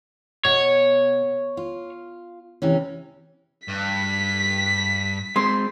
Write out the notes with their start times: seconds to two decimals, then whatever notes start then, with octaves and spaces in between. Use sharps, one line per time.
0.45 B2 C#5
1.57 F4
2.62 C3 E3 C#4
3.68 G2 B6
5.36 G#3 C4 C6